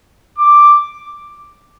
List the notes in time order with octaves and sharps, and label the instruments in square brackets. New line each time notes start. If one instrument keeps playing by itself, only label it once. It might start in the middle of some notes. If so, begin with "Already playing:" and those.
[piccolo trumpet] D6